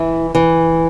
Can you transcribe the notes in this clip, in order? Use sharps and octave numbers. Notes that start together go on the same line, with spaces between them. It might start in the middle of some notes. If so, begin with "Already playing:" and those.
Already playing: E3 E4
E3